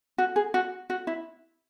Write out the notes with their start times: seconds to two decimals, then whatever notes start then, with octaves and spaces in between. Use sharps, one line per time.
0.18 F#4
0.36 G#4
0.54 F#4
0.90 F#4
1.07 E4